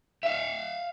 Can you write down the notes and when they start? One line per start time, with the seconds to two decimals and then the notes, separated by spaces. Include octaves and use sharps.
0.23 E5 F5